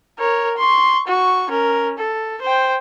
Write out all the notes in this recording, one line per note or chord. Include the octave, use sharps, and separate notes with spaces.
A#4 C#5
C6 C#6
F#4 C#6
C#4 A#4
A4
C5 G5